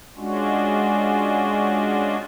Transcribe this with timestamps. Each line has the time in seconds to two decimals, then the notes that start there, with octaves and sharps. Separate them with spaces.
0.17 G#3 C#4 D4 F4 F#4